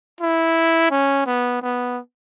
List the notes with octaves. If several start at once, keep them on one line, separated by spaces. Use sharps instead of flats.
E4
C#4
B3
B3